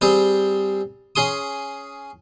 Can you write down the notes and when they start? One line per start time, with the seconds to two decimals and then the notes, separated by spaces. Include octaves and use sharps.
0.01 G3 C4 G#4
1.16 C#4 G#4 C6 D#6